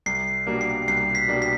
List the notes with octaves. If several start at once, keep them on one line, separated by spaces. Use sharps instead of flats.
C2 C7
B2 G3 A#3 D4
C7
C2 C7
B6
B2 G3 A#3 D4
B6